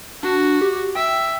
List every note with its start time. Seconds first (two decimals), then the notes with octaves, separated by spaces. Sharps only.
0.23 D4 F#4
0.61 G4
0.95 E5 G5